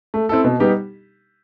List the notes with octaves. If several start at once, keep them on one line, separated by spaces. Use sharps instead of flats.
A3
C4 E4 A4
B2
G3 B3 D#4 G4